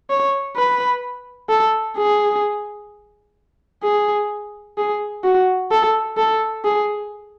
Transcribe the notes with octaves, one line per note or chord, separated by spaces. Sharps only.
C#5
B4
A4
G#4
G#4
G#4
F#4
A4
A4
G#4